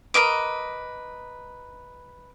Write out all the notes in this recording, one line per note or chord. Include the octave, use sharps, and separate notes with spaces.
A#4 B4 D#5 D6